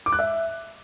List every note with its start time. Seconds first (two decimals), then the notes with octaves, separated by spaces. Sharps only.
0.06 D6
0.12 F#6
0.19 E5